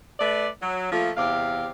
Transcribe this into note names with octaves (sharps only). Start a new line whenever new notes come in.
A3 B4 D5
F#3
F3 A3 A#3 F4
E2 C3 G4 F5